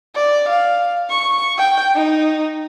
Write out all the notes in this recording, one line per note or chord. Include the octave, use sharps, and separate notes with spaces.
D5
F5
C#6
G5
D#4